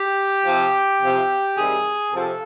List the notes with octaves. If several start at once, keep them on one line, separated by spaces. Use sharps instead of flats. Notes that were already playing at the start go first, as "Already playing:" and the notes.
Already playing: G4
C3 F3
C3 F3
C3 D#3 G3 G#4
C3 F3 A4